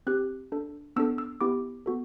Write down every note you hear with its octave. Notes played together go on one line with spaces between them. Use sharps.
C4 G4 F#6
D4 A4
B3 D4 A4 E6
E6
B3 E4 G4 D6
B3 F#4 A4